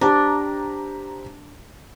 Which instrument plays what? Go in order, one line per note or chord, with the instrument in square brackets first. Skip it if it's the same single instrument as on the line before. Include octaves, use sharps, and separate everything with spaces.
[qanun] D4 [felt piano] G4 C5 A#5